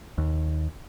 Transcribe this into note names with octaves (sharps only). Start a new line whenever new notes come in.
D#2